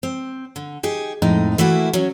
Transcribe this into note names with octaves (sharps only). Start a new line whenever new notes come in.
C4
D3
D#4 G4 G#4
F2 A2 G#3 D#4
E3 A3 A#3 E4 F#4
F#3 C#4